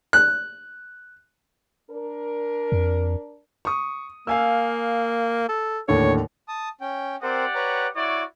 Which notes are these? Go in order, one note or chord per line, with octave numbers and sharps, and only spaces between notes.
F#6
D4 A#4
F2
C#6 D#6
A#3 F5 G#5 E6
A4
D#2 A2 D3 C#5
A5 D#6
C#4 G5
C4 G4 A#4 C5 D5 F#5
B4 C#5 A#5
E4 F#4 C#5 D5